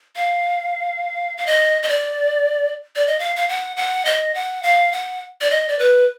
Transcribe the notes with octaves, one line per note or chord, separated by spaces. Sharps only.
F5
F5
D#5
D#5
D5
D5
D#5
F5
F5
F#5
F#5
D#5
F#5
F5
F#5
D5
D#5
D5
B4